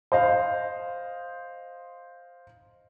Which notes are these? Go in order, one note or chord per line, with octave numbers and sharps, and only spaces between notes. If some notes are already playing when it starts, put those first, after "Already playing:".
C5 D#5 F5